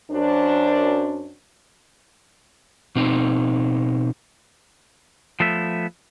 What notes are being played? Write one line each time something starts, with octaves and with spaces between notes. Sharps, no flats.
F#2 D4 C5
B2 C4 D#4
F3 A3 B3 E5